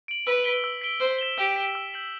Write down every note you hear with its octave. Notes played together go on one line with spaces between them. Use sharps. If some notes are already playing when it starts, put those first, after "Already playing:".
D7 F#7
B4 E6
B6 D7 G7
E6
B6 D7 G7
C5 E6
B6 E7 G7
G4 E6
B6 E7 G7
E6
G6 B6 F#7